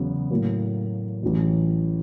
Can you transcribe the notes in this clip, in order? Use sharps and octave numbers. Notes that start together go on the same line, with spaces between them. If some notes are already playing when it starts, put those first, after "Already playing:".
Already playing: E2 C#3 F#3 B3
A2 F#3 A#3
A1 A2 F#3